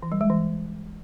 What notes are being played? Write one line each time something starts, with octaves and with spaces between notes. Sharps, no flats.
E3
G3
G#3
E3